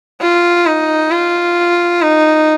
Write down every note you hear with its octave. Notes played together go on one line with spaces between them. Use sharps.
F4
D#4
F4
D#4